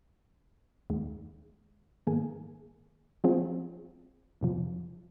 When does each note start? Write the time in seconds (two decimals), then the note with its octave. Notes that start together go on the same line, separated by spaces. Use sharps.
0.90 D#2 D#3 G#3
2.07 G#2 D#3 A#3 G#4
3.24 F3 C4 F4 G#4
4.41 F2 C3 F3